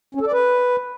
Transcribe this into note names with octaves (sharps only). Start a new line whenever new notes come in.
C#4
A4
D5
B4